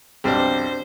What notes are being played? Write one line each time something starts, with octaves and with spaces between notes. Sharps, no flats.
B1 F2 G3 C4 D4 C5